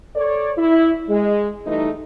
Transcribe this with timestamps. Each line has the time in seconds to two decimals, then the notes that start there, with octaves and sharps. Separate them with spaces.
0.15 A4 C#5 D5
0.57 E4
1.09 G#3
1.66 E3 G3 A3 D#4